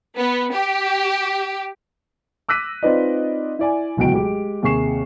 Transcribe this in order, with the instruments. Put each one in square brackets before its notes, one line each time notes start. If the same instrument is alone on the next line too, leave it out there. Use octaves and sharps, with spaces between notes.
[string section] B3
G4
[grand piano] D6 E6 F#6 A#6 B6 D#7
C4 D#4 F4 B4 D5 D#5
E4 D5 G#5
D1 C#2 B2 F#4 G5 D7
G#3 G4
D#2 C3 G#4 C#6 C7 E7